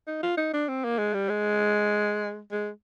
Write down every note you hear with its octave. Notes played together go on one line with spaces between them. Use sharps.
D#4
F4
D#4
D4
C4
A#3
G#3
G3
G#3
G#3